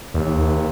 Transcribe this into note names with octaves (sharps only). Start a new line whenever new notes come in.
D#2